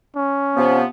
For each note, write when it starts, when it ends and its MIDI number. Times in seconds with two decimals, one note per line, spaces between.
0.16 0.83 61
0.57 0.84 48
0.57 0.84 53
0.57 0.84 59